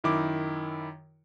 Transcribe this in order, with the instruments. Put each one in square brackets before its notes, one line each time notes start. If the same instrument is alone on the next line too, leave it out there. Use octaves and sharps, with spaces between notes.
[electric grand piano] F#2 D#3 E4 D6